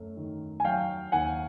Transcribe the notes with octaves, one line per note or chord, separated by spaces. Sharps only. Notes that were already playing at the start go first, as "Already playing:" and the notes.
Already playing: F#2 A3
D#3
G#5
F#3 F5 G5
D#2 F#5 G#5